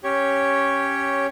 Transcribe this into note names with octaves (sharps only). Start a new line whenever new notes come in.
C#4 G4 C#5